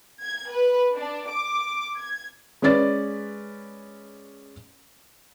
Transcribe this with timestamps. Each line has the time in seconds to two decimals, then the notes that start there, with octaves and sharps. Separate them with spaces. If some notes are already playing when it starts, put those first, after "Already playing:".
0.24 G#6
0.53 B4
0.97 D4
1.29 D6
1.98 G#6
2.62 G#3 C#4 B4 D5 A6